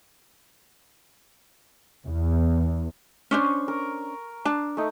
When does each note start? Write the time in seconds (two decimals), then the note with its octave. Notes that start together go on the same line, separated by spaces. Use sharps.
2.06 E2
3.31 C#4 D4 C5 C#6
3.68 A#4
4.45 D4 A5
4.77 A3 D#4